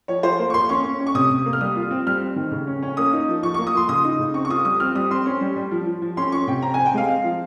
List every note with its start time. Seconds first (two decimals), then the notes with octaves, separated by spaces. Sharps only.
0.08 F3 C#5
0.23 F3 C5
0.39 A#3
0.50 C#6
0.54 A#3 C6
0.69 C#4 C#6
0.84 C#4
1.00 C#4
1.07 C#6
1.15 C3 D#6
1.30 C3
1.46 A#3
1.53 F6
1.61 G3 D#6
1.76 F4
1.91 C4
2.07 G3 F6
2.21 C4
2.36 D#3
2.51 C#3
2.67 C#4
2.82 C#4
2.97 A#3 D#6
3.13 D#4
3.28 F3
3.43 F3 C#6
3.54 C#6
3.59 A#3
3.67 D#6
3.74 F3 C6
3.89 C#3 D#6
4.04 D#4
4.19 C#3
4.34 C4 C#6
4.45 C#6
4.49 F4 D#6
4.65 G3 D#6
4.80 C4 F6
4.95 G3 D#6
5.11 C4 C6
5.26 C#4
5.41 G3
5.56 G3
5.72 F3
5.87 F3
6.02 F3
6.17 C#4 C6
6.32 C#4 C#6
6.47 C3 G5
6.62 C4 A#5
6.74 G#5
6.78 C4
6.86 G5
6.94 G#3 F5
7.08 C4
7.24 F3